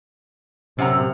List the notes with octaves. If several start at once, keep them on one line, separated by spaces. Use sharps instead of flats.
F#2 C3 F#5 A#5